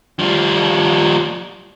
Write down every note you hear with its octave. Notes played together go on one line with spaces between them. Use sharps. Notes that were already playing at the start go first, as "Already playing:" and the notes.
F3 G3